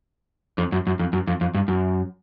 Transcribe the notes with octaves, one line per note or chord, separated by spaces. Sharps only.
F2
F#2
F#2
F2
F#2
F2
F2
G2
F#2